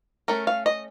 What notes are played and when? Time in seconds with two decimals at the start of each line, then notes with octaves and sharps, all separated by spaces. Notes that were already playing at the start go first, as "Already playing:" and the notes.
0.28 A3 C#4 A#4
0.47 F5
0.66 D#5